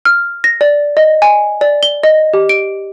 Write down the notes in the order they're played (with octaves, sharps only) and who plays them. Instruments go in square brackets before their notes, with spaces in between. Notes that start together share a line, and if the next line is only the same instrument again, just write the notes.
[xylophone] F6
A#6
D5
D#5
G#5
D5
G7
D#5
G4
D7